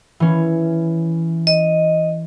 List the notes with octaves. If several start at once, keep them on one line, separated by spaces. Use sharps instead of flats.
E3 C#4
D#5